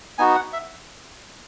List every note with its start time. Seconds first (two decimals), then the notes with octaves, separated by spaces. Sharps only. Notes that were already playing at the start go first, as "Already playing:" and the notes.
0.18 B3 D#4 F#4 G#5
0.35 F#5
0.53 E5